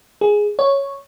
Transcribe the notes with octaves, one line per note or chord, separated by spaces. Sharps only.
G#4
C#5